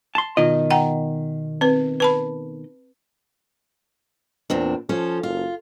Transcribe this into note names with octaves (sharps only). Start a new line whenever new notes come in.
A5 C6
B2 D#3 F4 D#5
F#5 G5 A#5
C4 B4
B4 A5 B5
E2 A#2 C4 D4
F3 C#4 A4 C5
F#1 F4